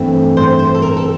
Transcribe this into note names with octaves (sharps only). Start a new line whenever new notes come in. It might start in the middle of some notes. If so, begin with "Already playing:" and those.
Already playing: G2 E3 A3 C4
C5
C5
A4
A#4
A4